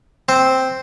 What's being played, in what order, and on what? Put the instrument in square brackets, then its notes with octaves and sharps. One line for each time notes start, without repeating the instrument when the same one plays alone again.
[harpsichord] C4 C5